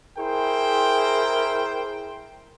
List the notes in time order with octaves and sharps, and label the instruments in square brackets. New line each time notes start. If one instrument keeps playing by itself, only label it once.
[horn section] E4 G#4 A#4 C5 G5